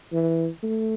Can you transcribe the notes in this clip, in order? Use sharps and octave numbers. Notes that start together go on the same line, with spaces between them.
E3
A3